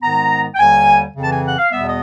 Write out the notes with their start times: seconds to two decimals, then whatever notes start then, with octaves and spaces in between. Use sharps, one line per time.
0.02 G#2 D#3 G#3 B3 A#5
0.55 G5
0.59 D#2 D3 G3 G#5
1.16 F2 C#3 E3 A5
1.30 G#5
1.44 F#5
1.58 F5
1.72 E2 B2 G3 B3 E5
1.86 D#5